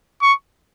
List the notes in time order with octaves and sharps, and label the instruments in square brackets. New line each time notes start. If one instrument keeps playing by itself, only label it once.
[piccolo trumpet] C#6